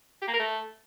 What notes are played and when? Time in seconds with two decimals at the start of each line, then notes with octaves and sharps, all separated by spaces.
0.22 G4
0.28 A#3
0.34 A#4
0.39 A3